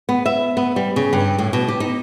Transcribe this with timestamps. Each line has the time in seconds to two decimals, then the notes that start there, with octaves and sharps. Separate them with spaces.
0.09 B3
0.26 E5
0.57 B3
0.76 G3
0.96 C#3
1.13 G2
1.38 A2
1.53 B2
1.69 G4
1.80 D#4